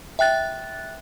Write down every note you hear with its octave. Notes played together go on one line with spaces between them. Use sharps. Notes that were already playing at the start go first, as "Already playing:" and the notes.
E5 G5 F#6 A6